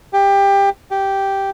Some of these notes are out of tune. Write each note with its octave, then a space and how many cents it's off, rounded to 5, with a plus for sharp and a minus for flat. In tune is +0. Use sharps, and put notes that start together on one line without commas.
G4 +20
G4 -5